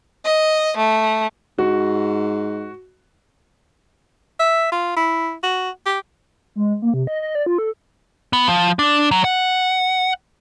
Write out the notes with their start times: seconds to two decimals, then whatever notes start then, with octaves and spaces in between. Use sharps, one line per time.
0.24 D#5
0.77 A3
1.58 G#2 F#4
4.40 E5
4.72 F4
4.96 E4
5.43 F#4
5.86 G4
6.56 G#3
6.82 A#3
6.94 C3
7.07 D#5
7.22 D#5
7.35 D5
7.46 F4
7.58 A4
8.33 B3
8.48 F3
8.79 D4
9.11 F#3
9.24 F#5